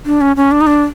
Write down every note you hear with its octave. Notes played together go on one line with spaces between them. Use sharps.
D4
C#4
C#4
D4
D#4
D4